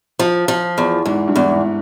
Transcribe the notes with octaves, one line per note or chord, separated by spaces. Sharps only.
F3
F3
E2
E2 G#2
G2
E2
G#2